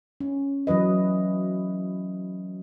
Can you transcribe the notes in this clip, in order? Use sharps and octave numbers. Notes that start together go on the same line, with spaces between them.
C#4
E3 F#3 B4 D#5